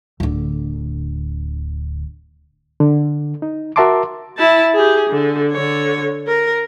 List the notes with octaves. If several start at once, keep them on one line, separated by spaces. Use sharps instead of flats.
D1 D3
D3
D#4
F#4 A#4 E5 A5 C6 D6
E4 A5
G4 G#4
D3
D3 C#5
A#4